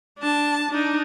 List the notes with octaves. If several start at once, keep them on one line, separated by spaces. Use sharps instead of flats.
D4 A5
D4 D#4